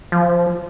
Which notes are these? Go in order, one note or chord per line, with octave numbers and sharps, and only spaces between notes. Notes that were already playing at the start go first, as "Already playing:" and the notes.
F3